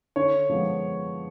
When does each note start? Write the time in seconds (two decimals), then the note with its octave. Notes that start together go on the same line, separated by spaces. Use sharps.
0.16 D3 C#5
0.50 F3 G#3 B3